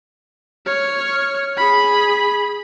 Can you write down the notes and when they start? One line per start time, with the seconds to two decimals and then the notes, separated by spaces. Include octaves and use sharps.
0.66 C#5 F6
1.57 G#4 B5